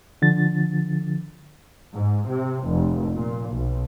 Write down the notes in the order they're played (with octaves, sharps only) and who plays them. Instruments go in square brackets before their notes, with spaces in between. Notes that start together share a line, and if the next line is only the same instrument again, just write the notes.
[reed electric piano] D3 F3 A6
[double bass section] G#2
C3
F1
A#2
B1